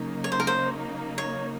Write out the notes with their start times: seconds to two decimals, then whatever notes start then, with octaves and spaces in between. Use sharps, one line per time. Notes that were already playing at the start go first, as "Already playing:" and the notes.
Already playing: C#3 F#3 A#3 D#4
0.24 C#5
0.32 C5
0.40 A#4
0.47 C5
1.18 C#5